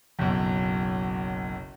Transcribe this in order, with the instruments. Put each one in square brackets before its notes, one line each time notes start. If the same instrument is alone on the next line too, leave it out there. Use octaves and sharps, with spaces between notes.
[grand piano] F#1 B1